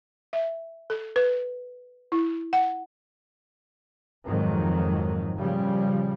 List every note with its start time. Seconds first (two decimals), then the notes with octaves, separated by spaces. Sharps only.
0.33 E5
0.90 A4
1.16 B4
2.12 E4
2.53 F#5
4.25 F2 G#2 D#3 F#3
5.37 A#2 C#3 F3 G3